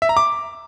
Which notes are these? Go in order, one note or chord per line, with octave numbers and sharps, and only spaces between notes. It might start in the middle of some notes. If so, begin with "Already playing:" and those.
E5
A#5
D6